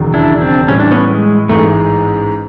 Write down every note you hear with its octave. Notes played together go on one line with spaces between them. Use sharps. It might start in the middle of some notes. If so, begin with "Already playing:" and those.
Already playing: E1 D#2 C#3 F#3
D4 E4
C4 D4
A2 E3 G3 C#4
D4
B3 C#4
G#3
A1 G#2 E3 G#3 A3